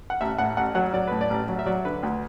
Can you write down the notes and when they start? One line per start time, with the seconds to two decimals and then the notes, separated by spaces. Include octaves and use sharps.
0.10 F#5
0.21 A1 E5
0.38 A2 F#5
0.57 A1 F#5
0.75 F#3 F#5
0.94 F#3 D5
1.07 A2 B4
1.21 D5
1.30 A1
1.49 F#3
1.59 E5
1.66 F#3 D5
1.85 D3 B4
2.03 D2